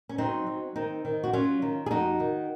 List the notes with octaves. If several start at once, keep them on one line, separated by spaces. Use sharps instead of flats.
C#4
F#3 C4 D#4
F#3
D#3 C4 D#4
D#3
F#4
F#3 C#4 F4
D#3
G#4
F2 D#4 F#4
D#3